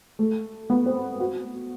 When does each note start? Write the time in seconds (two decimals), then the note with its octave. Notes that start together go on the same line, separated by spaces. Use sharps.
0.19 A3
0.70 B3
0.86 C4
1.20 F#4